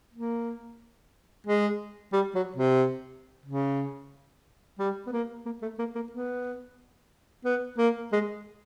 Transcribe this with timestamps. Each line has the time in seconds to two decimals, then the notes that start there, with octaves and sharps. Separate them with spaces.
0.13 A#3
1.47 G#3
2.13 G3
2.35 F#3
2.57 C3
3.46 C#3
4.79 G3
5.07 B3
5.12 A#3
5.46 A#3
5.62 A3
5.79 A#3
5.95 A#3
6.12 B3
7.45 B3
7.78 A#3
8.12 G#3